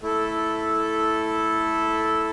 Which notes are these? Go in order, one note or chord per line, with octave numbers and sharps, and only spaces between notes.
A3 E4 A4